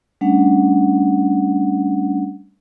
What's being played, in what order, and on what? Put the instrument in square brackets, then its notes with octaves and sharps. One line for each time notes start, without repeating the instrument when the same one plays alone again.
[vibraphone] G3 A3 C#4 D4 F#5